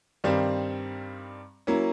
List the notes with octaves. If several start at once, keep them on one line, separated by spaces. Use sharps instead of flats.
G2 D#3 G3 C4
F#3 A#3 C#4 E4